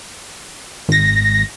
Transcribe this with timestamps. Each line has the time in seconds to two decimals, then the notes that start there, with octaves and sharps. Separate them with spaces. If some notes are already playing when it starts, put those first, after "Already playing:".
0.89 G#1 A#6